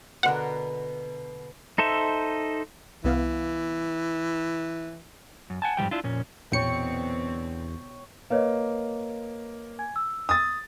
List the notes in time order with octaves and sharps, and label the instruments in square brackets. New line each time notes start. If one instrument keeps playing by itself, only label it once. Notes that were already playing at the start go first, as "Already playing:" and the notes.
[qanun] B2 D3 A#4 [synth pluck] F#5
[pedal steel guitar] D#4 A4 C5 E5
[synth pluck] C2 B3 F5 [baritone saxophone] E3
[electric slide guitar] F#2
F#5 G#5 A5
F2 G#2 E3 G3 G5
D4 E4 F4
F2 A#2 C#4
[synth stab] A#1 C#7 [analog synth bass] E2 [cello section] B2 D3 C4 [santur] C#5 G5
[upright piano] A#3 [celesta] B4 C#5 D#5
[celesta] G#5 G#6
E6
[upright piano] D#6 A6